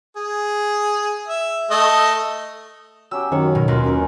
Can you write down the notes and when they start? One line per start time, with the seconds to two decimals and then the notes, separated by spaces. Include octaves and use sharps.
0.16 G#4
1.28 E5
1.71 A3 A4 D#5
3.11 F#3 C#4 G4 E6
3.31 F#2 D#3 C#5
3.55 B2
3.68 D#2 A#3 F4 B4
3.84 F#2 C#4 A#4 G#5